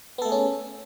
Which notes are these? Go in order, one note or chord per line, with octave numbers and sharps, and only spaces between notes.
A3 B3 C#4 G#4 A4